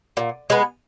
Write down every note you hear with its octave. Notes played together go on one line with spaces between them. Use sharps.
A#2
G#3 B3